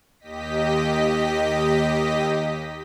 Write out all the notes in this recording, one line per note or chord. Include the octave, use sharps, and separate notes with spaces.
D#2 G4 D#5 B6